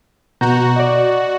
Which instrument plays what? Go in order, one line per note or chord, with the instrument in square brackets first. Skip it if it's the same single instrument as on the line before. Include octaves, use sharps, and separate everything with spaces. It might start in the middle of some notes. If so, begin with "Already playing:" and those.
[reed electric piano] B2 A#5 G6 [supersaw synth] F#4
[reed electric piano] D5 D#5